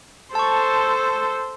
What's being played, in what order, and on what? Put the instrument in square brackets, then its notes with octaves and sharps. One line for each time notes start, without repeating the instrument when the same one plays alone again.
[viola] A4 C5 [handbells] A5 C#6